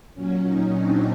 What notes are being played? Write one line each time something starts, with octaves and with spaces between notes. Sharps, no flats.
A#2 F#3 C#4
C#4 D#4
C4 D4